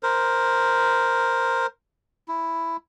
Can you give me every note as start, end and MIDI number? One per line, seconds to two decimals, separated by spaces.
0.03 1.66 70
0.03 1.66 72
2.28 2.77 64